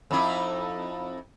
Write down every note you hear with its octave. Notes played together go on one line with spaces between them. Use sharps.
F2 D#4 E4